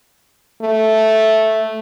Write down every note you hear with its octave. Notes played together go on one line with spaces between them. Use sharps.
A3